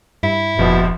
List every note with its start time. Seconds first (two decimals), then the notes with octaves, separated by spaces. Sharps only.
0.23 G2 E4
0.59 F1 A#1 B2 F3